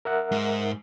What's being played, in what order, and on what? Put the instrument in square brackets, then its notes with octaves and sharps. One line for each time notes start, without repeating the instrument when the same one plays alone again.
[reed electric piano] A#4 E5 F#5
[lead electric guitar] G#2